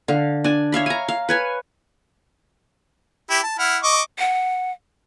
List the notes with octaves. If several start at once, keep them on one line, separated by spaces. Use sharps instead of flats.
D3 F5
D4 G#5
C#5 E5 F5 B5
G#5 A#5
F5
B4 C#5 G#5
E4 G4
A5
E4 F#5 F6
D#5 C#6 D6
F#5